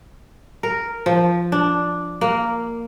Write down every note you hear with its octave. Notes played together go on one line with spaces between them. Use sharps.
A#4
F3
D4
A#3